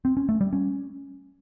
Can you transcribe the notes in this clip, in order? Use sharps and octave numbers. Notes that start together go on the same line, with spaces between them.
C4
C#4
A3
G3
C#4